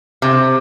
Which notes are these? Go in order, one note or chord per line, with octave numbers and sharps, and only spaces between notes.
C3